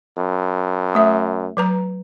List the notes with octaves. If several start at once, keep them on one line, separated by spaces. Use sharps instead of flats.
F#2
A3 E5
F#3 B4 A#5